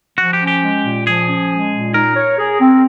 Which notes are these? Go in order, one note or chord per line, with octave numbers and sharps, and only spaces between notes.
F3 F#4
G4
C#4
G4
G#3
A#2
F3 G#4
C#4
G#3
A#2
D#4 A#4
C#5
G#4
C4